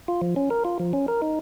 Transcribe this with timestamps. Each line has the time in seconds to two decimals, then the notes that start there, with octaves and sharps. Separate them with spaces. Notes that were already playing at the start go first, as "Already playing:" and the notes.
0.08 F4
0.21 F3
0.36 C#4
0.50 A#4
0.65 F4
0.80 F3
0.93 C#4
1.08 A#4
1.22 D#4